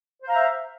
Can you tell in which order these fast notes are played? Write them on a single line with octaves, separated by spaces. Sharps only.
C5 F5 A#5 E5